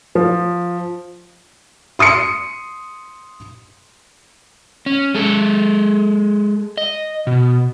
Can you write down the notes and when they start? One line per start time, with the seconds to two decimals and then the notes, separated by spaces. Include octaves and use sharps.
0.15 F3
1.99 C6 D#6 C7 C#7
4.86 C#4
5.14 G#3 A4
6.77 D#5
7.27 B2